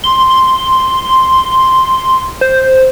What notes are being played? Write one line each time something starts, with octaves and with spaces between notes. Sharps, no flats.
C6
C5